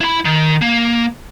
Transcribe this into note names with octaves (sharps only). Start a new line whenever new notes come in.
E4 B5
D#3
A#3